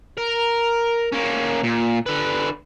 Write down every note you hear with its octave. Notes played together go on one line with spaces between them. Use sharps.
A#4
A#3 C#4
A#2
D3 B4